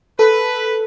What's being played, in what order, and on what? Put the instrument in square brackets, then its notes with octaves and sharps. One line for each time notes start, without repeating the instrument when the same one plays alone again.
[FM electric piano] A4 [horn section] B4